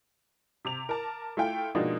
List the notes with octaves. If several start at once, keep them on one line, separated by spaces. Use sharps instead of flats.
C3 D6 F7
A#4 A5
A3 E4 F4 G5
B2 F3 G#3 A#3 D4 D#4